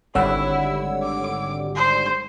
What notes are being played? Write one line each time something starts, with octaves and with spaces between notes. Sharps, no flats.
G#1 D3 G3 E4 C#5 F#5 E6
D6
C5